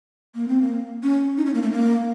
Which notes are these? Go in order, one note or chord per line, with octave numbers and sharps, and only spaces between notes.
A#3
C4
A#3
C#4
D#4
C#4
A#3
A3
A#3